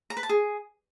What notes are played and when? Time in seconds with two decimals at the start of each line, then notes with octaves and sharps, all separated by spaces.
0.10 A#5
0.17 B4
0.23 A5
0.29 G#4